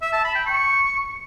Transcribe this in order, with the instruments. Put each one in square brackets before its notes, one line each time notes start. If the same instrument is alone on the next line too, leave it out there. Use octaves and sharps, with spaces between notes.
[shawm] E5
A5
B5
G5
C#6